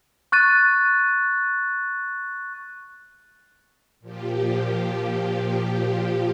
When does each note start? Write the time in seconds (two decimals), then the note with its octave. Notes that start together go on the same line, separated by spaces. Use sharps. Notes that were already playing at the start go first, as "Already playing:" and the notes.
0.32 C#6 F#6 A6 D#7
4.00 A#2 F3 G4